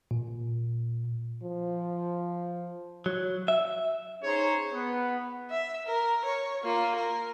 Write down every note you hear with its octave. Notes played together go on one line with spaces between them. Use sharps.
A#2
F3
F#3
E5
C#4 D#4 G#4 C5 C#5
B3
E5
A#4
C#5
A#3 F4
A#4